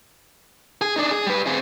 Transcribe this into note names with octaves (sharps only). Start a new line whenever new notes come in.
G#4
D4 D#4
G#4
G3 B4
C4 G#4